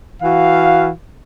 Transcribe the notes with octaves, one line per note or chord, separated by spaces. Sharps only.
E3 F#4 F5